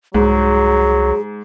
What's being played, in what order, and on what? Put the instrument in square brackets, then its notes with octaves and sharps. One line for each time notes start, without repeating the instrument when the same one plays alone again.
[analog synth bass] C2 [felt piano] G#2 [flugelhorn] F#3 [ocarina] G#4